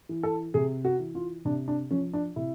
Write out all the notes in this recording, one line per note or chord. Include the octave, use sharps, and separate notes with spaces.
E3
A4
C3 G#4
F#4
E3
F4
C3 D4
D4
F3 C#4
D4
C3 E4